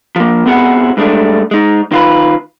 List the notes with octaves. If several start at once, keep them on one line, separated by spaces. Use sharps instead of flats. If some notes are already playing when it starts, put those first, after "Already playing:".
F3 A#3
B3 C4 E4 F#4 G#4 F#5
G2 G#3 A3 D4
G#3 D#4
D#3 F4 B4